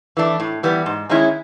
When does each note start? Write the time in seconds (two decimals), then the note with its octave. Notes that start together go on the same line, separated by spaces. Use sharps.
0.17 E3 A3 D4
0.40 A2
0.63 E3 G3 B3
0.86 G#2
1.09 D#3 G#3 C#4 E4